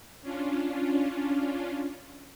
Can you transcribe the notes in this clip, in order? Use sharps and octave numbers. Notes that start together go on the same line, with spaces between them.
C#4 D4 F4